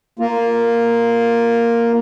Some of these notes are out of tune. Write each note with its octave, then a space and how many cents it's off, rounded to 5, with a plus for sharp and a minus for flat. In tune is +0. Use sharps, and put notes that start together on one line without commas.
A#3 +0 F4 +0